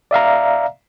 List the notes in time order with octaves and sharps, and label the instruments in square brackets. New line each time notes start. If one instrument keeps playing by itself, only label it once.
[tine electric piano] D5 E5 F5 A#5